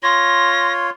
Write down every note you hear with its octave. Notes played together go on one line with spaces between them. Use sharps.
F4 C#5 C6 A#6